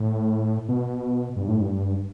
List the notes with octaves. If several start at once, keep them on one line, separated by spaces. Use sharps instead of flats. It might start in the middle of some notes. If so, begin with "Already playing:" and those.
Already playing: A2
B2
G2
A2
G2